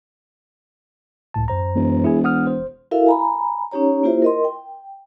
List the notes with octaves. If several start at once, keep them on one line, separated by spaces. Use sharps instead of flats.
C#2 A2 A5
F#2 C5 A#5
E1
E4 G#4 G#5
F#5 D#6 F6
C5
E4 F#4 A4 A#4 E5 F5
G#5 A#5 B5
C#4 D#4 G4 C#5 A#5
A#3 E4 F4 G4 C5 E5
A#4 D#5 C6
G5